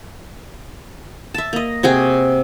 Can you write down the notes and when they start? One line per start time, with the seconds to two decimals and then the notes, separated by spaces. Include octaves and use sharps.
1.34 E5 A5
1.53 A#3 D#5
1.83 C3 F#4 G#4 G5